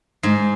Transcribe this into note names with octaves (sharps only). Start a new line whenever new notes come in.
G#2 G#3